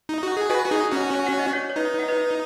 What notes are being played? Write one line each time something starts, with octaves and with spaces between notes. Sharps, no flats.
D#4
F#4
G#4
F#4 B4 D#5 G#5
F#4
D#4 G#4
C#4 F#4
G#5
F#5
D#5
C#5 F#5
C#5
D#4 B4 D#5
F#5
B4 D#5